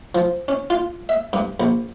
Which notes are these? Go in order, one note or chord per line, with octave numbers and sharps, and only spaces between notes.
F3
C#4
F4
E5
G2
A#1